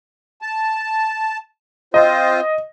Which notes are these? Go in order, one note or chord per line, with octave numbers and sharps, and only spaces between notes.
A5
C4 F4 C5 D#5